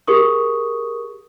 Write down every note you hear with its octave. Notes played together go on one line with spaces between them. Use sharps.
G4 G#4 A#4 C#6 D#6